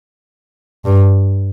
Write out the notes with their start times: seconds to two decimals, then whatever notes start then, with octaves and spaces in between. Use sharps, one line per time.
0.85 G2